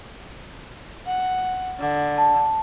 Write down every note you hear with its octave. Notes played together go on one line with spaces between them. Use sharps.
F#5
D3
A5